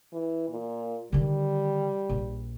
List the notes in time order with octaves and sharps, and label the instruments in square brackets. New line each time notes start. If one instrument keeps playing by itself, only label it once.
[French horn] E3
A#2
[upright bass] D3 D#3 [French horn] G3
[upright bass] A#1